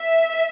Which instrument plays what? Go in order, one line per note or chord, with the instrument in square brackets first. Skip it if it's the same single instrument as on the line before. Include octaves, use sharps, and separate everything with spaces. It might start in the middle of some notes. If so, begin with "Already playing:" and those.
Already playing: [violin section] E5